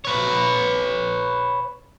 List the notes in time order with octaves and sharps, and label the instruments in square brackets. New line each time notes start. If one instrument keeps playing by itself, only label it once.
[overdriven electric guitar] B4 C#5